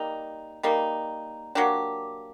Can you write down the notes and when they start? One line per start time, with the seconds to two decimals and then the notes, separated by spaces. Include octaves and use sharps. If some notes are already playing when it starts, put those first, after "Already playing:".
Already playing: G3 A#3 D#4
0.63 G3 A#3 D#4
1.55 F#3 A#3 D4 G4